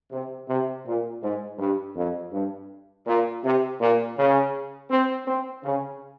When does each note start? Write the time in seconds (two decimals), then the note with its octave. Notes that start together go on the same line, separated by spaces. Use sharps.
0.11 C3
0.48 C3
0.86 A#2
1.22 G#2
1.59 G2
1.96 F2
2.33 G2
3.06 A#2
3.44 C3
3.80 A#2
4.17 C#3
4.90 C4
5.27 C4
5.64 C#3